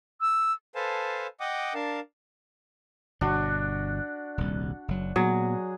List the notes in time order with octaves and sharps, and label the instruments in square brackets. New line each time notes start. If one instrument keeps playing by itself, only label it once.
[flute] E6
[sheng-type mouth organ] A4 B4 C5 F5 G#5 A5
D#5 F#5 G5 D6 D#6
D4 A#4 F5 A5
[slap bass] G1 B2 [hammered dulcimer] D4 F#4
[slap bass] D#1 C2
F#1 F#3
[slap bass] A#2 B3 [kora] F#3 [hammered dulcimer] G#4